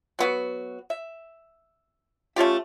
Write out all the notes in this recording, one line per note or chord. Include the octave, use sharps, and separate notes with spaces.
F#3 B3 F#4
E5
A3 C#4 F4 G4